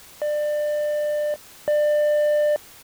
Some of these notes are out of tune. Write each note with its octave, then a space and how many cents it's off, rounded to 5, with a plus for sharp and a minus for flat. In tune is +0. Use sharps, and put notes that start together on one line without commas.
D5 +25
D5 +25